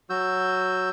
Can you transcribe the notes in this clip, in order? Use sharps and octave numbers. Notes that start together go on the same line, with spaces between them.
F#3 F#4 E6 G6